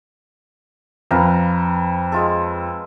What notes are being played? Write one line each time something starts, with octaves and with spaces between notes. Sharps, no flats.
F2 B4 F5 A#5
G#3 F4 A4